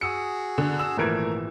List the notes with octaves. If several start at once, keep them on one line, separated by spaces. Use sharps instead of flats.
F#4 G#4 D#6 E6 C#7
D3
E6 E7
G#1 A#2 E3 A3 A#4 G#6